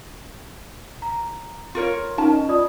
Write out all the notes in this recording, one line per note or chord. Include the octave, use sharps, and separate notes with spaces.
A#5
F4 A#4 C#5
C#4 D#4 A#4 A5
D#5
F4 D5 D#6